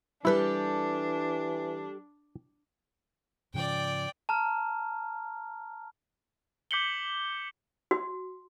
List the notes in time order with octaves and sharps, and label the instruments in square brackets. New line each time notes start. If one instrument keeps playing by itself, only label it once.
[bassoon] E3 [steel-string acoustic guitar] G3 G4 A4 [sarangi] D4 [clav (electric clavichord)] E4 B4
[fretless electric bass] G#2 C#3 F3 [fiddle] D5 G5
[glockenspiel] A5 A#5 F6
[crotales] D6 G6 B6 C#7 F#7 G7
[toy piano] F#4